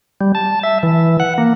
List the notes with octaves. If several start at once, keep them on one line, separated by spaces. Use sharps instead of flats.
G3
A5
E5
E3
F#5
A#3